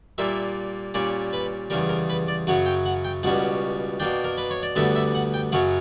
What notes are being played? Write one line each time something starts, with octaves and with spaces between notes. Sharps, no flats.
A#2 G3 A#3 E5
A#2 G3 C#4 D5
B4
E2 C#3 G3 A#4
A#4
B4
D5
F#2 C#3 F#3 C#4 F#5
G5
F#5
G5
C#2 B2 G3 C#4 F#5
B2 A#3 D4 G5
A#4
B4
C#5
D5
D2 D3 G3 B3 E5
E5
F#5
G5
F#2 C#3 F#3 C#4 F#5